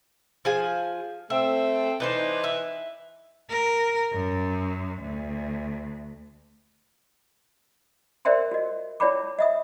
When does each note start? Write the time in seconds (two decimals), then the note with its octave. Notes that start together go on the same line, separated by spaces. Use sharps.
0.45 F3 G#4 G#5
1.30 A3 C4 E5
2.00 E3 D4 D#4 B4 C5 D#5
2.44 E5
3.50 A#4
4.12 F#2
5.01 D2
8.25 A#4 C5 D5 E5 G5 C6
8.52 F#4 D#5
9.00 E4 C#5 D5 G5 B5 D6
9.39 D#5 E5 D#6